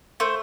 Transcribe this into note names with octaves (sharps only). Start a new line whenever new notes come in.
A3 C5